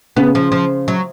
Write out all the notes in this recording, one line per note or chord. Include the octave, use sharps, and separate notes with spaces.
C#3 B3
F3
F3
F#3